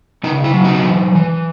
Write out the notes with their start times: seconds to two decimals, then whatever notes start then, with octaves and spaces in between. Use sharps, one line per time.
0.24 C#3 D#4
0.44 E4
0.54 F#3
0.64 D#4 F#4
0.85 E3
1.15 E3